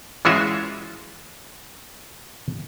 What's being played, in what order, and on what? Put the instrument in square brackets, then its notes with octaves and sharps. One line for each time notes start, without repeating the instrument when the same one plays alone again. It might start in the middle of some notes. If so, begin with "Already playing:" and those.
[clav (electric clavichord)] E3 G#3 C#4 F4 F#4 E5